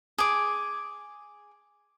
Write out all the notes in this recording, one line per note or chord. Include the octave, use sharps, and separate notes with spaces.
G#4 D6